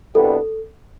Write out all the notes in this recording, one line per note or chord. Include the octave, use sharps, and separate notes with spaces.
C2 B2 G3 B3 D4 A4